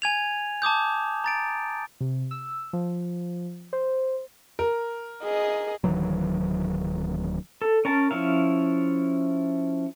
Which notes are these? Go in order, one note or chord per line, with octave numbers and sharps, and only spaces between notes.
G#5 G#6 F7
A5 D6 D#6 G6
A#5 A6 D7
C3
E6
F3
C5
A#4
G#4 D#5
D1 D#3 E3 F#3
A4
C#4 A#4 A5
F3 C#4 E4 F5